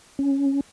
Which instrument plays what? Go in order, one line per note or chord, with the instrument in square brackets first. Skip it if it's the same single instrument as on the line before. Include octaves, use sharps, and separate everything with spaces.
[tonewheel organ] C#4